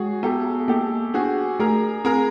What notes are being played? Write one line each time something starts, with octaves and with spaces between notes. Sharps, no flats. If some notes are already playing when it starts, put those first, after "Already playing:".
Already playing: G#3 F#4 G#4
B3 G4 A4
A#3 G4 A4
D4 F#4 G#4
A3 G#4 A#4
C4 G#4 A#4